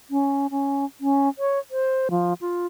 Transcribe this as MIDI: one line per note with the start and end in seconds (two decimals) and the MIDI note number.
0.10 0.47 61
0.51 0.85 61
1.01 1.29 61
1.39 1.59 73
1.71 2.08 72
2.11 2.33 53
2.41 2.66 65